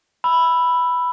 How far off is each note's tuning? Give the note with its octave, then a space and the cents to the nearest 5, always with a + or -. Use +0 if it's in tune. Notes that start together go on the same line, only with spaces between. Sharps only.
B5 +0 E6 +10